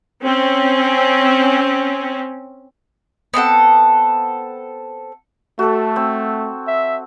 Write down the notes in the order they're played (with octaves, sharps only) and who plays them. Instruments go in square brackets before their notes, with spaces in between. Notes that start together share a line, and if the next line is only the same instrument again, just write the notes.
[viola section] C4 C#4
[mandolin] B3 C4 A4 F#5
[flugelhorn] A3 [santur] F#4 A4
[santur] C4
[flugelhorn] E5